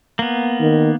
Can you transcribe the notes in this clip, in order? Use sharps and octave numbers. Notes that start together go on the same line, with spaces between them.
A#3 B3
D#3